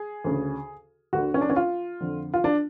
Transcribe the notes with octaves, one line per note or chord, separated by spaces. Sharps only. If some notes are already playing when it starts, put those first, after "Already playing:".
Already playing: G#4
D2 C#3
D2 D3 F#4
C#4
D4
C#4
F4
F2 D3
F4
D4